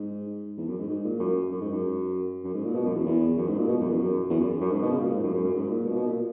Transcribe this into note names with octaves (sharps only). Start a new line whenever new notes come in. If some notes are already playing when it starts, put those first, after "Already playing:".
Already playing: G#2
E2
F#2
G#2
G#2
A#2
F#2
F#2
G#2
F#2
F#2
G#2
A#2
B2
F#2
E2
E2
F#2
G#2
A#2
B2
F#2
E2
F#2
E2
F#2
F#2
G#2
B2
C#3
A#2
G#2
F#2
F#2
F#2
G#2
A#2
B2
B2
A#2